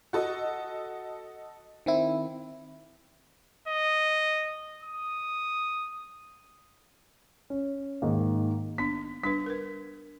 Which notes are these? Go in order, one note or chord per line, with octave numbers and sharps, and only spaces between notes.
F#4 A4 D#5
D#3 C4 E4
D#5
D#6
C#4
G#2 D#3 A#3
B3 D4 B6
G3 D4 B4 B6
A#4 B4